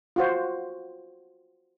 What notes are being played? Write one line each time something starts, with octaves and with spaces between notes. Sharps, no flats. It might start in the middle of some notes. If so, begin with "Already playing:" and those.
F4 F#4 C5